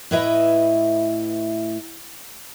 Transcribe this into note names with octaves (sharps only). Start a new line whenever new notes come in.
A2 E4 B4 D#5 E5 A#5